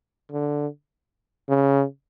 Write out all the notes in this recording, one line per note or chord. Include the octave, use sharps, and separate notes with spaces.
D3
C#3